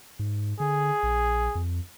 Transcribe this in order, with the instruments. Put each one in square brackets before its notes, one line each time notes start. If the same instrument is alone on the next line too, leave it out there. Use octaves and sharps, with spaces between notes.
[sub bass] G#2
[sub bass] D3 [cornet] G#4
[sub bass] A#1
F2